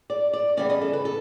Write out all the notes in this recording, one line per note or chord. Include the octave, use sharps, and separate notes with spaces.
D5
D5
C#3 E3 G3 B3 D5
D#5
A4
B4
A4